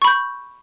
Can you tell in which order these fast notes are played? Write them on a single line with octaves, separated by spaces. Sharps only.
C#6 B5 G6